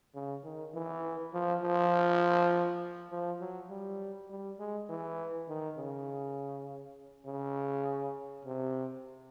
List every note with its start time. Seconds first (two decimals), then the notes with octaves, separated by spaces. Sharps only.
0.14 C#3
0.44 D#3
0.74 E3
1.33 F3
1.62 F3
3.11 F3
3.40 F#3
3.70 G3
4.30 G3
4.59 G#3
4.89 E3
5.48 D#3
5.78 C#3
7.26 C#3
8.45 C3